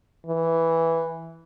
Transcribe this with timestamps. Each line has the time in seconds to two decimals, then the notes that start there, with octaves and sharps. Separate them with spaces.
0.26 E3